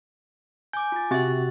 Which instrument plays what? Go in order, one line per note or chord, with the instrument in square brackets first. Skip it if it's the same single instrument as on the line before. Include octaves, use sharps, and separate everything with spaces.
[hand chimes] G#5 D6 [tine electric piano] G6
[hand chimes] F4 A6
[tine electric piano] C3 F#4 A6 [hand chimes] C4 E5